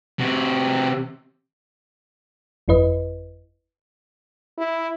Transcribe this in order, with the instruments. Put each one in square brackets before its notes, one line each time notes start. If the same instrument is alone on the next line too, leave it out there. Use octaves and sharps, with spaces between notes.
[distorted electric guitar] C3 F#4
[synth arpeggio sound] G1 F2 E4 B4 D#5
[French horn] E4